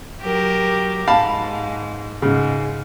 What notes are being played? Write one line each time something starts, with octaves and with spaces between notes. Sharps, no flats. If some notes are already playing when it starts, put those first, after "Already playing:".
F#3 G4 A#4
G#2 F5 A5 B5
G#2 C#3